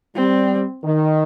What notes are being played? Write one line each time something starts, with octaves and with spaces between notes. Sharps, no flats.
G3 C4
D#3